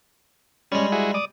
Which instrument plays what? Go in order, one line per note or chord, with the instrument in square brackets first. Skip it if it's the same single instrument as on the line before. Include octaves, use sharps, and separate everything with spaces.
[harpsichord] G3 G#3 [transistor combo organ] C#4
[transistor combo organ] E4 F#4 G#4
D5 D#6